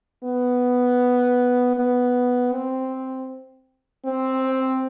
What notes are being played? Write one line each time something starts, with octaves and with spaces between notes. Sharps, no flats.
B3
B3
C4
C4